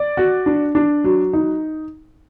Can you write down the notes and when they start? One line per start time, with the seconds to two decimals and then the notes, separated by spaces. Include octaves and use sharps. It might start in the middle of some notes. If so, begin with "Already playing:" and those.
Already playing: D5
0.17 F#4
0.46 D4
0.75 D4
1.04 F#3
1.33 D#4